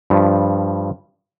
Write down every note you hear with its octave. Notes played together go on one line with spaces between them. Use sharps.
G2 F3